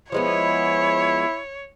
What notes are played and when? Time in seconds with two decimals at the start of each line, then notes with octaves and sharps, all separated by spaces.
0.12 F3 G#3 B3 E4 C#5